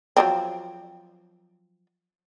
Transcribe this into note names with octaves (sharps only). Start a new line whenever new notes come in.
F3 F#3 C4